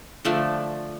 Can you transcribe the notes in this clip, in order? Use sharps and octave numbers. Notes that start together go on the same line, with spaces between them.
D3 F3 A3 D4